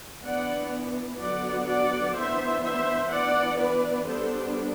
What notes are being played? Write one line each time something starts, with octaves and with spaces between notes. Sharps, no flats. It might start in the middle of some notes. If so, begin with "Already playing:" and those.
E3 B3 D4 D5 F#5
D3 F#3 B3 D4 D5 F#5
D5 F#5
E3 B3 D4 C5 E5
C5 E5
E3 B3 D4 D5 F#5
B4 D5
G3 B3 D4 A4 C5